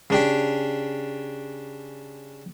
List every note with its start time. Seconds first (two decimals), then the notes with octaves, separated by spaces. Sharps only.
0.10 C#3 D4 G4